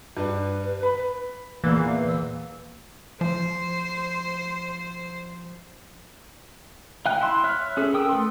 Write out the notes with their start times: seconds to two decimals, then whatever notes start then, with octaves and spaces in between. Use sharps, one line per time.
0.17 G2 B4
0.83 B5
1.64 E2 A#2 E3 A#3 F5
2.07 E6
3.21 F3 C5
7.06 F5 G5 G#5 F#6
7.21 E4 C6
7.44 C#5 E5 F6 F#6
7.77 C#4 G#4 A4
7.93 A#4 G5 D#6 E6
8.09 A3 B4 C6